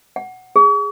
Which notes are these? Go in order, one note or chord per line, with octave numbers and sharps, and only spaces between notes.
F#5
G#4